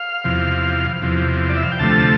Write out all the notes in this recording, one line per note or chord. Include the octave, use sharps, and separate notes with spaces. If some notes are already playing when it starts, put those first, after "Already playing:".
Already playing: F5
E2 C3 F3
E2 C3 F3
D5
E5
F5
G5
D2 C3 F3 A3 A5